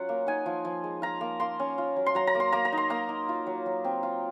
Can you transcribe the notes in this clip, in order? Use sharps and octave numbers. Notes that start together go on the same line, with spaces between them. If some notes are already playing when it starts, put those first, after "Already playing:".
Already playing: F#3 C#4 F4 F#5
A#3
D#4 G#5
F3
F3
G#3
F4 A#5
A#3
A#3 C6
C#4
F4
F#3
C6
F#3 A#5
A#5
A#3
C6
A#3 A#5
A#5
D#4
C6
A#3 A#5
D#4
F4
F#3
F#3
C4
F4